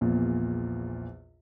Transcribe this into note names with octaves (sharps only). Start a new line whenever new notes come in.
A#1 E2 A#2